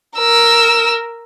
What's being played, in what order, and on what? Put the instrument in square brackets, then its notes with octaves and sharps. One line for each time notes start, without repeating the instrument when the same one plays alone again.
[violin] A#4 E6